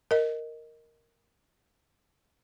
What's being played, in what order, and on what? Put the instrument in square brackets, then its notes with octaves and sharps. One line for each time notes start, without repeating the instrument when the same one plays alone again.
[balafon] A#4 D#5